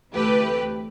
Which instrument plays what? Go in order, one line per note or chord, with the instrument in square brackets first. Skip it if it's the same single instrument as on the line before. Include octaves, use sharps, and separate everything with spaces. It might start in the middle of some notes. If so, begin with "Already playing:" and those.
[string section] D2 C3 E3 A3 G4 B4